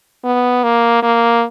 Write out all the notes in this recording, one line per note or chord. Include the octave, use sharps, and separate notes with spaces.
B3
A#3
A#3